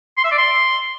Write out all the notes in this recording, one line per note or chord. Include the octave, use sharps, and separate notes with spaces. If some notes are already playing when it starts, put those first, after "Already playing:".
C6
E5
D5
C6